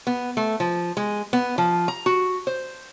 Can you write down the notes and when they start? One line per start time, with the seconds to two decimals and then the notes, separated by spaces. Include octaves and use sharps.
0.07 B3
0.37 A3
0.60 F3
0.97 G#3
1.33 B3
1.58 F3
1.88 A#5
2.06 F#4
2.47 C5